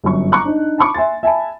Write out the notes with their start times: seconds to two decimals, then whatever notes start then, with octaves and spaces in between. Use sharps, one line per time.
0.04 G1 F#2 C#6
0.32 A#5 C#6 D6 F#6
0.45 D4 D#4
0.78 A5 B5 C#6 D6
0.94 E5 G#5 C6 A6
1.23 E5 G#5 A5 B5